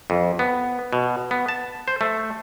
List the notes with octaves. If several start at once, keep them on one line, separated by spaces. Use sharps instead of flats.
F2
B3
B2
B3
A5
C5
A3